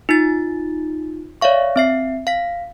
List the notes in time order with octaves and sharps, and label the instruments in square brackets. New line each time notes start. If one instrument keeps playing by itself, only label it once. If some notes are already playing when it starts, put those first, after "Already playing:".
[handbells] D#4 F4 A6
C#5 D5 E5 F5 C#6
C4 E5 C7
F5 B6